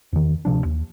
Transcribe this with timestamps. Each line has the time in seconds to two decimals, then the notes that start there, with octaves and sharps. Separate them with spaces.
0.13 E2 D#3
0.45 D1 C3 F3 D4
0.65 D#2